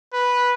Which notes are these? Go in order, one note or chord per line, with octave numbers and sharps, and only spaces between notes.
B4